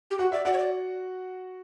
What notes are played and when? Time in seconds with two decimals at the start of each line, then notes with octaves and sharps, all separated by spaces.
0.11 G4
0.19 F#4 F#5
0.32 D5 E5
0.45 F#4 D5 F#5
0.53 C#5
0.58 D5